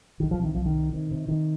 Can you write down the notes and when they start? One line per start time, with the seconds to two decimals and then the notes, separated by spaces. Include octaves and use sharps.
0.20 C2 D#3
0.31 F3
0.39 C3 D#3
0.54 C2 F3
0.66 D#3
0.75 C3
0.93 C3 D#3
1.11 C3
1.28 C3 D#3